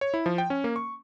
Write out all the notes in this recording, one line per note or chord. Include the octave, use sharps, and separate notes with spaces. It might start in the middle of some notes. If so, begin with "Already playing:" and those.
C#5
E4
F3
G5
C#4
A#3
C#6